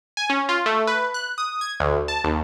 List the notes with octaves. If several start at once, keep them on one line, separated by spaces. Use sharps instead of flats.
G#5
C#4
F4
A3
B4
F#6
D#6
G#6
D2
A5
D#2